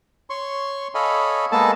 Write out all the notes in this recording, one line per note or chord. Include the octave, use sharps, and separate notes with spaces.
C#5 C6 C#6
A4 C#5 D#5 F5 G#5 B5
G#3 A#3 B3 G#4 A4 A5